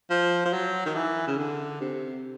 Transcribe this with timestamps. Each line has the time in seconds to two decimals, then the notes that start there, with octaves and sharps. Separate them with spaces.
0.10 F3
0.45 F3
0.53 F#3
0.86 D#3
0.95 E3
1.27 C#3
1.38 D3
1.81 C3